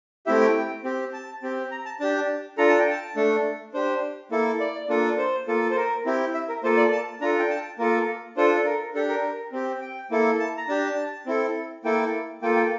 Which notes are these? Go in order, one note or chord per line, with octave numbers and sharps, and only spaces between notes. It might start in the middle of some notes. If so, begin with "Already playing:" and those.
A3 C4 E4 G4 E5
G5
C4 G4
A5
C4 G4
A#5
A5
D4 G4 A5
D4 F4 A4 A#5
A5
G5
A5
A3 D4 A4
D4 G4 C5
A#3 E4 A4
D5
A#3 D4 F4 A4
C5
A#3 F4 A4
C5
A#4
C4 E4 G4
E5
A#4
A#3 F4 A4 C5
D5
A5
D4 F4 A4 A#5
G5
A5
A#3 F4 A4 A#4
D4 F4 A4 C5
A4
A#4
D4 G4 A4
A#4
C4 G4
G5
A#3 E4 A4
A5
A#5
D4 G4 A5
C4 E4 A4
A#3 E4 A4 G5
A#3 F4 A4 G5
G5